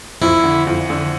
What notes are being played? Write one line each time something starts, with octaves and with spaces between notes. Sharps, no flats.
F2 E4
D3
F2
D3